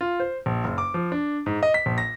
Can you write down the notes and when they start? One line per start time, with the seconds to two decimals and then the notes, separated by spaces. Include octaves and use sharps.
0.01 F4
0.20 C5
0.46 A#1
0.64 F#1
0.78 D6
0.94 F3
1.12 D4
1.46 G#2
1.63 D#5
1.74 B6
1.86 A#1
1.98 A#6